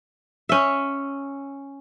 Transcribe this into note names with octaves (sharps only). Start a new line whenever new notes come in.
C#4 E5